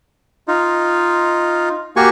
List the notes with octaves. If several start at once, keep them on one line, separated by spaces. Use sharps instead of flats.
D#4 F4
A#3 F#4 G4 G#5 C#6